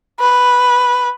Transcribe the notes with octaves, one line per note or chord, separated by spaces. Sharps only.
B4